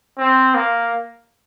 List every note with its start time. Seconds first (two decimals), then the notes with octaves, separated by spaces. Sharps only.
0.19 C4
0.55 A#3